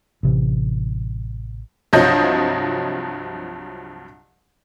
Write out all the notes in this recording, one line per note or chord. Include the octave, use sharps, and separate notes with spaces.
A1 C3 E3
C2 G2 F3 F#3 D#5 G6